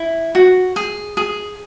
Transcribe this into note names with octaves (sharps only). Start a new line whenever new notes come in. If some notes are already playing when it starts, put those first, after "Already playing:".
Already playing: E4
F#4
G#4
G#4